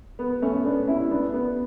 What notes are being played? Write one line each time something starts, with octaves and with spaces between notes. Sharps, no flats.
B3
A3 C#4
B3 D4
C#4 E4
B3 D4
B3